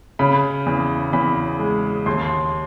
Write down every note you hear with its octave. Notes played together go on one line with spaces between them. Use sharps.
C#3 B5
E2
E2 B5
G#3
D#2 C6